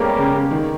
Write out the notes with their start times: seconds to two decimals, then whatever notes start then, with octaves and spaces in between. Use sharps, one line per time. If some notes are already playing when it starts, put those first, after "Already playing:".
Already playing: G3 G#3 A#3 B3 C#4 G4 A#4
0.19 C#3
0.35 C#3
0.51 D#3